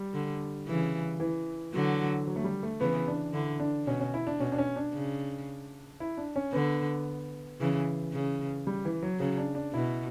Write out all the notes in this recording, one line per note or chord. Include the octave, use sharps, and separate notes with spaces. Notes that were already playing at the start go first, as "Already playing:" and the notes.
Already playing: G3
D3
C#3 E3
E3
D3 F#3
F#3
A3
G3
A3
C#3 E3 B3
D4
D3 E4
D4
B2 C#4
C#4
E4
D4
B2 C#4
D4
C#4
D4
C#3
E4
D4
C#4
D3 B3
C#3 E3
C#3
G3
E3
F#3
C#3 F#3
D4
D4
B2 E4